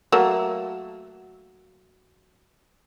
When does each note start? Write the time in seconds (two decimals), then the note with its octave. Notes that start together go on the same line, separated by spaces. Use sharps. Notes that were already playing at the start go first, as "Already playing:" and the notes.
0.12 F#3 A3 A#3